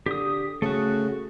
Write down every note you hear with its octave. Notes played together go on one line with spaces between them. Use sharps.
D3 G4 D#6
C#3 A3 F#4